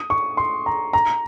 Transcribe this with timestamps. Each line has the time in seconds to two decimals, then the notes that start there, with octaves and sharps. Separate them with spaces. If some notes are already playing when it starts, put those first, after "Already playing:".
Already playing: D#6
0.10 C#6
0.37 C6
0.66 A#5
0.93 A#5